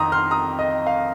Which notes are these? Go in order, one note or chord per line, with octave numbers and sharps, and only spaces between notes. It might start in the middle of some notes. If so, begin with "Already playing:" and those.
Already playing: F2 D#3 A#5 C6 D#6
C6 F6
A#5 D#6
D#5
F5